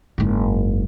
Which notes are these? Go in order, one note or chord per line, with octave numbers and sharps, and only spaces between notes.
F#1 G#2